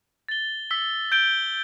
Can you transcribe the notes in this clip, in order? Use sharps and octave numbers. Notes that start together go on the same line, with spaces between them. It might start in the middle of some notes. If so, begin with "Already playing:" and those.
A6 G7
E6 B6 G7
G6 D7 G7